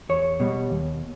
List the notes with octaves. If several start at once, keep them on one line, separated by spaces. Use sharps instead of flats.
E2 C#5
B2 G3
D#2